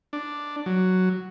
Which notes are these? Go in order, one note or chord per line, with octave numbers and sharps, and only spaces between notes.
D4
F#3